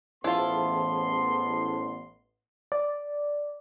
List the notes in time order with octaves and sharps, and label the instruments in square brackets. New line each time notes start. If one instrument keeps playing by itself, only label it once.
[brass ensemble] A1 [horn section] B3 C6 [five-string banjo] E4 F4 [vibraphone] G#4 C5 A5
[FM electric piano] D5